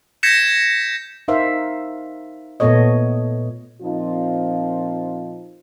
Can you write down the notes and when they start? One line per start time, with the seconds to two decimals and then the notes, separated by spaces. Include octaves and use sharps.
0.23 G6 G#6 A#6 B6 C#7 E7
1.28 D#4 A#4 C5 E5 F5
2.60 A#2 A3 B3 A4 C#5 D#5
3.82 A#2 F3 C4 D#4 F4